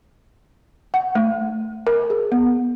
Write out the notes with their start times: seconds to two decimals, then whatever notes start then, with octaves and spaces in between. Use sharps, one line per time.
0.94 F#5
1.15 A3
1.87 A#4
2.10 G#4
2.32 B3